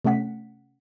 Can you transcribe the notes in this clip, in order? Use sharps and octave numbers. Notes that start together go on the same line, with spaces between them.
C3 A3 C#4 F#5 B6